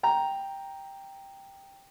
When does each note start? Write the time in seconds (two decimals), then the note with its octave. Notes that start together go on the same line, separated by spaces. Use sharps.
0.03 G5 A#5